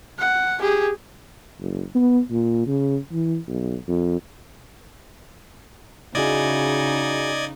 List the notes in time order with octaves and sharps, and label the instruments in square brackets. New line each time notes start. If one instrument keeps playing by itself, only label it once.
[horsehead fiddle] F#5
G4 G#4
[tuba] F#1
B3
A#2
C#3
E3
B1
F2
[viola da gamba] C#3 D#4 [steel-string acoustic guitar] E4 F#4 G#4 [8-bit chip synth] D5 D#5 G#6